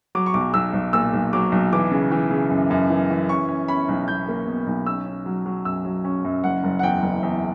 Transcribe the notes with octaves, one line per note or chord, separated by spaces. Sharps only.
F#3 D6
C#6
B1 D6
B1 E6
B1
A#2 E6
B1
F#3 D6
B1
E3 D6
C#3
E3
C#3
F#2
F#2
E3
E3
C#4 C#6
C#4
C#4 B5
B1
B1 G6
A#3
B2
B1
C#4 E6
C#4
F#3
F#3
F#2 E6
F#3
C#4
F#2
F#1 F#5
F#1
F#5
E2 G5
F#1
E2